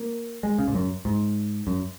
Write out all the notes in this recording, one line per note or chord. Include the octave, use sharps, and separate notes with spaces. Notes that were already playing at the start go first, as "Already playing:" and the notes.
Already playing: A#3
G#3
C#3
G#2
F#2
G#2
F#2